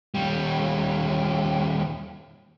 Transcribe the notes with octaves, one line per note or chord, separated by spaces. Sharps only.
D#2 G3